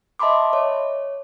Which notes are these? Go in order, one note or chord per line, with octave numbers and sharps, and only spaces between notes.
D#5 E5 A5 B5 C6 D6
C#5